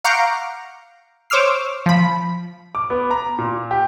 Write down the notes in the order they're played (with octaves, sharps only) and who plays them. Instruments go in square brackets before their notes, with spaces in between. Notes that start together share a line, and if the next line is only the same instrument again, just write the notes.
[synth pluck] F5 F#5 A#5 C#6 D6 G6
C5 C#5 D6 E6 F6 C7
F3 B5
[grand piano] D6
B3
A#5
A#2
G4